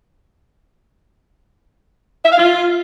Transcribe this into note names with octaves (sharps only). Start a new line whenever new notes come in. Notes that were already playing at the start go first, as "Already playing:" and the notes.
E5
F5
F4